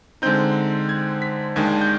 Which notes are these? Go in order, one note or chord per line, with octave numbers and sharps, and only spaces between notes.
D3 G#3 C4 D#4 G6
G#6
B6
D#2 D#3 G#3 D4 G#6
G6